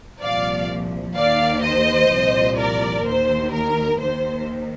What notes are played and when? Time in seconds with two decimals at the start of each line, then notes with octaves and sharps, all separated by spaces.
0.23 C2 A#2 F3 D5 F5
1.17 D#2 D#3 D5 F5
1.64 C5 D#5
2.12 C2 A#2 F3
2.59 A#4 D5
3.06 D#2 D#3 C5
3.53 A#4
4.01 D#2 D#3 C5